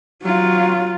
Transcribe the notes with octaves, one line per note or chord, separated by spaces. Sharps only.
F#3 F4